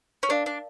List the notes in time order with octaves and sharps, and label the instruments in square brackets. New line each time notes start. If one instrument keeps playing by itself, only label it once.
[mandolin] C#4
[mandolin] D4 [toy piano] A#4 D5 F5
[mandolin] D4